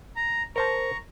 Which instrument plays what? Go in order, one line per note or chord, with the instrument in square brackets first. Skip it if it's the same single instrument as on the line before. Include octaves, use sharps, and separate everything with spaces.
[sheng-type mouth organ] A#5
[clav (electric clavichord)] A#4 C5 A5 [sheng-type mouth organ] A#5 C#6